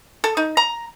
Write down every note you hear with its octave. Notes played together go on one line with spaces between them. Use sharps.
A4
D#4
A#5